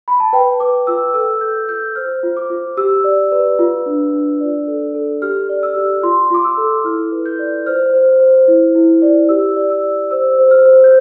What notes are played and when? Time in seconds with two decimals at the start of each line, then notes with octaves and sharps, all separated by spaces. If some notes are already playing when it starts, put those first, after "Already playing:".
0.08 B5
0.20 A5
0.33 B4 G5
0.60 B4 D6
0.87 F4 E6
1.14 A4 E6
1.41 A4 G6
1.68 F4 G6
1.96 C5 F6
2.23 F4
2.37 D6
2.50 F4
2.77 G4 E6
3.04 D5
3.32 B4
3.59 F4
3.86 D4
4.13 D4
4.41 D5
4.67 A4
4.95 A4
5.22 G4 F6
5.49 D5
5.63 E6
5.76 G4
6.03 F4 C6
6.30 F4 D6
6.44 E6
6.57 A4
6.84 E4 F6
7.12 B4
7.26 G6
7.39 D5
7.66 C5 F6
7.93 C5
8.20 C5
8.48 E4
8.75 E4
9.02 D5
9.29 G4 E6
9.56 D5
9.70 E6
9.83 G4
10.11 C5 E6
10.38 C5
10.51 F6
10.65 C5
10.84 G6